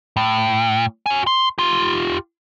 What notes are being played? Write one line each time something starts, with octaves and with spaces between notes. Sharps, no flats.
A2
F#4 G#5
C6
F4 G4